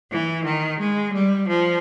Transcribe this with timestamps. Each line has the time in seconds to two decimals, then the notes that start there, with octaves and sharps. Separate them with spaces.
0.10 E3
0.45 D#3
0.79 G#3
1.13 G3
1.47 F3